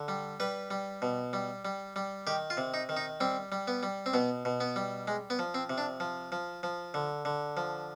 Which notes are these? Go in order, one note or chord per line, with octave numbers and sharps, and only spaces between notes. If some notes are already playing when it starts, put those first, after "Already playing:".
Already playing: D3
G3
G3 B4
G3
B2
G3
G3
G3
D#3 G4
F4
C3
D#4
D#3
D#4
G3 C4
G3
B3
G3
C4
B2 B3
B2
B3
G3
G#3
B3
F3
C4
C3
D4
F3
F3
F3
D3
D3
F3